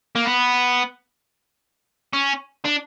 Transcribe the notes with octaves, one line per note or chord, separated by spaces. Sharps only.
A#3
B3
C#4
D4